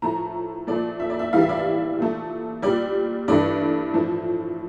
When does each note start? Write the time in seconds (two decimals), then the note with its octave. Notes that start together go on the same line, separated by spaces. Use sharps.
0.02 A2 F3 A3 A#5
0.67 A#2 F3 A3 D5
1.00 E5
1.10 D5
1.19 E5
1.33 A2 E3 G3 F5
1.41 E5
1.49 D5
1.57 E5
1.98 A#2 A3
2.62 A#2 G3 D5
3.28 G2 E3 A3 D5
3.93 A2 F3 A3